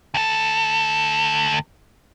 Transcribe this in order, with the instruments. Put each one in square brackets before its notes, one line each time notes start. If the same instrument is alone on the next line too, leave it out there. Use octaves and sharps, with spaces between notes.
[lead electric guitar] D2 A4